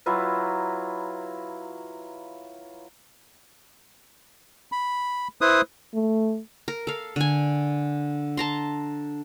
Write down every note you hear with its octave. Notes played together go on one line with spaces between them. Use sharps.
F#3 E4 F4 B4
B5
E4 B4 C5 D#6
A3
A#4
A4 F5
D3 G#5
A5 A#5 C6